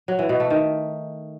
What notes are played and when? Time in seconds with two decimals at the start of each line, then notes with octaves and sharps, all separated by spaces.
0.08 F#3
0.19 E3
0.29 B2
0.40 A3
0.50 D#3